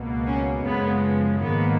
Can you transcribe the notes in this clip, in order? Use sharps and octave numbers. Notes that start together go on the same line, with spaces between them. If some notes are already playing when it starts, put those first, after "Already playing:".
Already playing: C#2 B2 A#3
C#4
F#2 C#3 F3 G#3 B3
G#2 D#3 A#3 B3